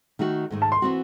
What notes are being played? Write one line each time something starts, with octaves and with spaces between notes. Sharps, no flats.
D#3 A3 D#4 F#4
G#2 D#3 A3
A5
C6
E3 C4 F#4